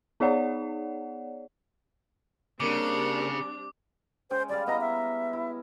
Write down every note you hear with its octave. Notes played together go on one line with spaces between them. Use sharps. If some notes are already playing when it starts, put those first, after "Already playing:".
B3 D#4 G#4 C#5 D5 F#5
C#3 G3 A#3 C4 D4 D6
G#3 C#4 C5 G5
G3 G#3 D5 F5
B3 E4 D#5 A#5
E5
E4